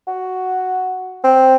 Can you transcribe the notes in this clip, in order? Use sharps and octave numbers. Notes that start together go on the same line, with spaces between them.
F#4
C4